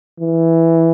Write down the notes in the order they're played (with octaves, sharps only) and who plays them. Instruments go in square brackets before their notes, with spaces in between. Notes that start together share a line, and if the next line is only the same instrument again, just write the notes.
[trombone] E3